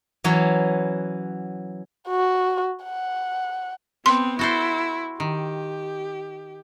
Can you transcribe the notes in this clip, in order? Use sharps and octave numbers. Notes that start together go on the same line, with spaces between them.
E3 F#3 B3 C#4
F#4
F#5
B3 C4 C6
E4 F#4 A4 C5
D#3 G4